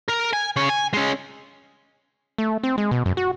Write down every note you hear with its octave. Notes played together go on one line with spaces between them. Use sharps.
A#4
G#5
C#3 C#5
G#5
G#3 C#4
A3
C4
G#3
B2
F#2
F#4